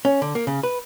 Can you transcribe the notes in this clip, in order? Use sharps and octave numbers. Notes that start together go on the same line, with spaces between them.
C#4
D3
A#3
C#3
B4